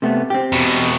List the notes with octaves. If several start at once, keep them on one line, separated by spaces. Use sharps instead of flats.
C3 A3 B3
C4 G4
E2 B2